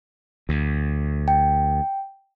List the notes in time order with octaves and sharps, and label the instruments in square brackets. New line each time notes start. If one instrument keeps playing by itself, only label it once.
[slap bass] D2
[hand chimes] G5